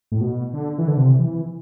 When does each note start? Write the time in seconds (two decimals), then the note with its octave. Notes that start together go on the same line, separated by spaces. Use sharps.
0.12 A2
0.21 B2
0.54 D3
0.78 E3
0.88 D3
0.97 C3
1.19 E3